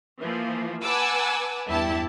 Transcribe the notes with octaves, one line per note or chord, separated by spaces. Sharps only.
E3 F3 A#3
B4 F#5 G#5 A5 D6 E6
E2 G2 E4 G4 A5